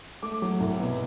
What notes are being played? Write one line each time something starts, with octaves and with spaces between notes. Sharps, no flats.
A3 D6
F#3
C2
B2